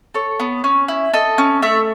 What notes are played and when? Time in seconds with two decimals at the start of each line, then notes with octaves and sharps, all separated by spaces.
0.14 A4 C#5
0.40 B3
0.64 C#4
0.88 E4
1.14 A4 D#5
1.38 C#4
1.62 A3 E5